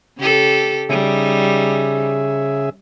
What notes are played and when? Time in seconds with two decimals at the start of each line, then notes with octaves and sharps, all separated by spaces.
0.18 C#3 G4 A4
0.89 C#3 G3 D#4 G#4 E5